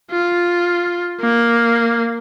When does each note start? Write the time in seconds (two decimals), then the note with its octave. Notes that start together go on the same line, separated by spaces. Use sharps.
0.11 F4
1.20 A#3